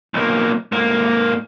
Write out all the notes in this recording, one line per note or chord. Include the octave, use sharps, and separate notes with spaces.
B1 A#3
G#2 A#3